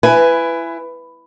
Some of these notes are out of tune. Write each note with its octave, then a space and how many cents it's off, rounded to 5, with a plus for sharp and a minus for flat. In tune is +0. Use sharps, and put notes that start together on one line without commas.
E4 +25 B4 +10 G#5 +0